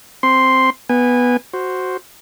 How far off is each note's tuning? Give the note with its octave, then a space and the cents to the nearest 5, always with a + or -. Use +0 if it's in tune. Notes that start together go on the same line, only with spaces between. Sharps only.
C4 +0 C6 +0
B3 -5 G#5 -25
F#4 +0 C5 +0